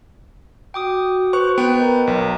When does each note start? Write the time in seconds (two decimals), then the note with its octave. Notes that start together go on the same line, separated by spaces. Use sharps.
0.74 F#4 G5 D6 D#6
1.33 B4 C5 C#6
1.58 B3 G5
1.79 A#4 D#5 A#5
2.07 B1